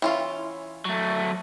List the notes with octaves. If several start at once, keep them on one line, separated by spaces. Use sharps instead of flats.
E3 C#4 F4
F#3 A3